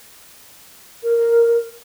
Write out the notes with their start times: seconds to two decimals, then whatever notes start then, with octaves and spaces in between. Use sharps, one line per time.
1.03 A#4